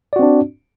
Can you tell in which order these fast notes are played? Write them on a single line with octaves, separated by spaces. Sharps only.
D5 F#4 C4 D4